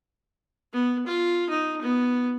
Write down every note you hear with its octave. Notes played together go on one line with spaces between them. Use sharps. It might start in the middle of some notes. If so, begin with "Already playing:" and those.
B3
F4
D#4
B3